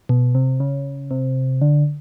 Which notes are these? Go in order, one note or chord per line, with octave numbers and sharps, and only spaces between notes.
B2
C3
C#3
C3
D3